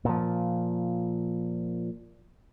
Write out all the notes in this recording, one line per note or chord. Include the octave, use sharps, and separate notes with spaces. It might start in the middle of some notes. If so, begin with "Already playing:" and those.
A#2 F3